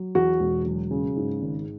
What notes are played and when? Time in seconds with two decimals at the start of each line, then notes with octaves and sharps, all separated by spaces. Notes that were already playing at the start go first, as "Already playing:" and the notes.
Already playing: F#3
0.15 E2 F#4
0.40 E1
0.65 F#3
0.91 C#3
1.16 G#2
1.42 G#1